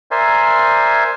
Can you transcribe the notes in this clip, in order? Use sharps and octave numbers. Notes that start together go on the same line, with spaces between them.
A#4 C5 D5 E5 G#5 C6